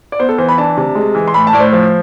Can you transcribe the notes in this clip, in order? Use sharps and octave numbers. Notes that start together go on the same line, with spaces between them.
D5
B3 C5
A4
E3 C5
B5
D4 A5
C3
G#3
E3
C6
A2 B5
A5
A2 D5
C5
F3